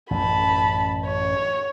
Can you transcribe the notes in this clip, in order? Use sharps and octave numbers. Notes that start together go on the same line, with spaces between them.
A1 F#2 A5 B5
C#5